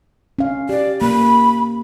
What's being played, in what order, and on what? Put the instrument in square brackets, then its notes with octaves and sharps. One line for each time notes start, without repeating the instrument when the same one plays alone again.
[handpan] C#4 F5
[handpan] G4 [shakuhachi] D5
[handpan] A#3 [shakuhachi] B5